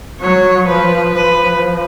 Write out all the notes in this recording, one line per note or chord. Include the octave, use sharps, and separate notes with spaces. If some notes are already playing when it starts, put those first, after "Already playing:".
F#3 C#5
F3 B4
F3 B4